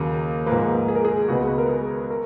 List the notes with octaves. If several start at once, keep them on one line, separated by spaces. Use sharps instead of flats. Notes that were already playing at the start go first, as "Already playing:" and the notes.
Already playing: D#2 C#3 F#3 A#3
G#2 F3 A#3 B4
G#4
A#4
G#4
C#2 B2 G#3 B3 F#4
B4
A#4
G#4
A#4